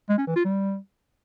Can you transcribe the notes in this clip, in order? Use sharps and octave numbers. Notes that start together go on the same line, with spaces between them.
G#3
C#4
E3
F4
G3